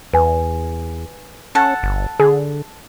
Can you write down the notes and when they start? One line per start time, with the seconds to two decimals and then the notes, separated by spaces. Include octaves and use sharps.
0.13 E2 B4 G#5
1.55 C#4 A4 F#5 A5
1.83 G1
2.20 D3 G#4